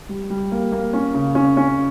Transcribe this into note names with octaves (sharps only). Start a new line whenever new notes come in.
G3
G3
A#3
A#3
C#4
C#3
C#4
C#4